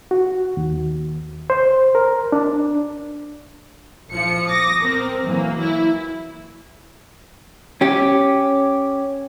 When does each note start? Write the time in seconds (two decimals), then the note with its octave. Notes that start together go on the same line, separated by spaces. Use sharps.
0.11 F#4
0.57 D#2
1.50 C5
1.95 A#4
2.32 D4
4.10 A#1 F3 C#7
4.50 D6 D#6 A#6
4.82 C4 A#4
5.26 E3 F#3 A#3
5.59 E4
7.81 C#4 G4